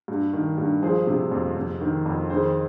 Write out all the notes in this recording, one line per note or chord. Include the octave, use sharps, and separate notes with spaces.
G2
D#3
G2
F3 G#4 C5
C3
F2
F2
D#3
F2
D#3 G#4 C5